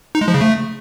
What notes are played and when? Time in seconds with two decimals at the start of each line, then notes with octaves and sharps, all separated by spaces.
0.15 D#4
0.21 G#3
0.28 F3
0.34 C#3
0.41 A3